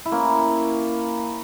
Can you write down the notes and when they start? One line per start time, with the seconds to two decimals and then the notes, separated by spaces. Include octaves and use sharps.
0.05 E4
0.11 A#3 C#4